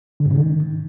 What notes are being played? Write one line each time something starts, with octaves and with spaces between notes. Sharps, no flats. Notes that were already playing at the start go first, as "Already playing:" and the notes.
D3
G#2
C#3
D#3